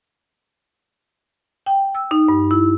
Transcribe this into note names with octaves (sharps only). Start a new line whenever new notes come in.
G5
E6
D#4
G2
E4